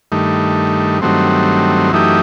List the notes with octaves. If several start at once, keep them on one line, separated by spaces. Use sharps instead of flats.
G2 D#3 A3
G2 D#3 F#3 A3 C4
F#2 E3 A3 D#4 G4